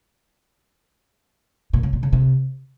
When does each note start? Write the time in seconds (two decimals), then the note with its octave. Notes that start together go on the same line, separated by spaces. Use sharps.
1.73 A#2
1.83 C#3
1.93 A#2
2.03 C#3
2.13 C3